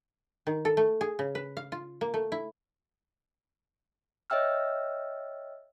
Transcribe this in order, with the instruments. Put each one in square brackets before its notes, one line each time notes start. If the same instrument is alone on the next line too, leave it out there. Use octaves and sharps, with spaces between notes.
[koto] D#3
A4
A3
G#4
C#3
B4
F5
F4
A#3
A3
E4
[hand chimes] C#5 D#5 E5 G5 E6 F6